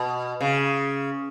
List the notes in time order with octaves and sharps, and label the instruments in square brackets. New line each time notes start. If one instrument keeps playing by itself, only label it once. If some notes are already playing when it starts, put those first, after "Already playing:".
Already playing: [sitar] B2
C#3